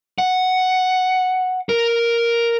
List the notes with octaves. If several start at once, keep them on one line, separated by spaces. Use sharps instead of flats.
F#5
A#4